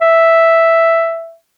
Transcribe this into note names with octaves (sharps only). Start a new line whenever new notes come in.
E5